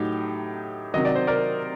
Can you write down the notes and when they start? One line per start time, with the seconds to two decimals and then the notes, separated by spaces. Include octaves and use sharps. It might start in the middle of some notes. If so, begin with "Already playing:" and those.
Already playing: A2 F#3 D#4 G4
0.94 C3 D#3 F#3 D#5
1.05 D5
1.15 C5
1.27 A#4 D5